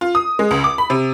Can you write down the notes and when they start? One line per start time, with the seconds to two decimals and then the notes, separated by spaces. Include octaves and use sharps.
0.01 F4
0.15 D#6
0.39 G#3
0.51 C#2
0.64 D6
0.78 B5
0.90 C3